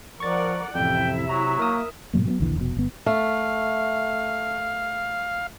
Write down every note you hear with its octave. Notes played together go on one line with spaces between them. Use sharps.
F3 A#4 D5 F#5 C#6 A6
A1 F2 C3 E4 E5 G5
F#3 A#5
A#3 A#4 D#6
G#2 B2 F#3 A#3
F#3 A#3 B3
A#1 D#2 D3 E3
F1 B2
G1 B3
A3 F5